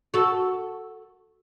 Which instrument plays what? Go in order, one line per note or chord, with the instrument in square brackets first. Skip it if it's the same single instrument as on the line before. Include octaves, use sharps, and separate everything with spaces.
[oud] F#4 A4